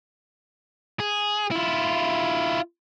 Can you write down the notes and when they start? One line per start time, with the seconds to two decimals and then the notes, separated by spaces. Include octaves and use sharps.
1.00 G#4
1.51 E4 F4